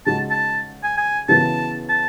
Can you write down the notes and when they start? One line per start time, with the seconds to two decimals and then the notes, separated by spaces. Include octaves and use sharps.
0.06 C#3 G#3 D#4 F#4 A5
0.30 A5
0.83 G#5
0.98 G#5
1.29 C#3 E3 B3 F#4 A5
1.89 A5